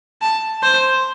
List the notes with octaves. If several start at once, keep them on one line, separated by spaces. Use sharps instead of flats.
A5
C5